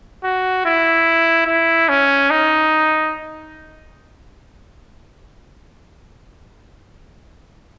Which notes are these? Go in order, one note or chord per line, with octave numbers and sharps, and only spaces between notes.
F#4
E4
E4
C#4
D#4